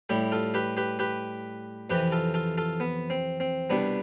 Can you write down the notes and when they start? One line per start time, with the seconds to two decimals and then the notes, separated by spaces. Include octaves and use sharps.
0.09 A2 G3 E4 G4
0.32 F4 A4
0.54 G4 B4
0.77 G4 B4
0.99 G4 B4
1.90 F2 C3 E3 G4 B4
2.12 F4 A4
2.34 F4 A4
2.58 F4 A4
2.80 B3
3.10 C4
3.40 C4
3.70 C2 B2 G3 B3 D4